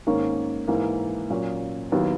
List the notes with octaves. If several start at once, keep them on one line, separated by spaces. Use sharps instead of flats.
G#2 D#3 A#3 C#4
G#2 E3 A#3
A#2 F#3 A#3 C#4
D#2 D#3 F#3 B3 E4